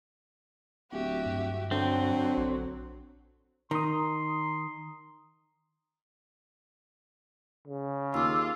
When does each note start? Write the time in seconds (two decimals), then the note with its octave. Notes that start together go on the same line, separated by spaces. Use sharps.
0.92 D1 F#4 G4 E5
1.26 G2
1.71 D3 F#3 C4
2.37 A#1
3.71 D#3 A#5 C6 D#6
7.68 C#3
8.14 D#2 F4 D6 E6